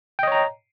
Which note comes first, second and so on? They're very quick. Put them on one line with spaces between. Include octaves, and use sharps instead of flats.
G5 D#5 C#5 A#5